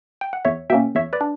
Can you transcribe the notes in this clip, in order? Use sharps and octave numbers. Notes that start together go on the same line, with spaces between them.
G5
F#5
E2 C#5 E5
B2 A#3 C#4 E5 G5
E2 C#5 E5
B4 D5
D4